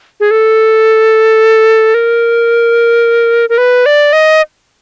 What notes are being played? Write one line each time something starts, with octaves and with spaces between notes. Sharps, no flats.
G#4
A4
A#4
A#4
B4
D5
D#5